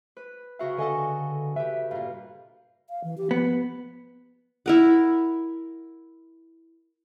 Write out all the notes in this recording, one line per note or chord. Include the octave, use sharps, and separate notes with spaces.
B4
C#3 F#4 E5 F5
D3 A4 D#5 G#5
G4 B4 E5
G2 A#2 F5
F5
E3
G4
F3 B3
E4 A#4 F#5